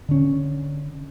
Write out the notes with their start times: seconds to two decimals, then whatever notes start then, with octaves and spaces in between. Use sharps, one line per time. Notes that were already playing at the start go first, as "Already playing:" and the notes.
0.09 D3 C#4